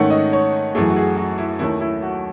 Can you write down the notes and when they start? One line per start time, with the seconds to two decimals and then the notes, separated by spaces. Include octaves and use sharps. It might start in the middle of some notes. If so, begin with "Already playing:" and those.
Already playing: G#2 D#3 A3 C#4 F#5
0.10 D#5
0.33 C#5
0.75 F#2 E3 A3 G#4
0.89 F#4
0.96 G#4
1.17 F#4
1.38 E4
1.59 D#2 D#3 A3 C#4 E4
1.81 E4
2.03 F#4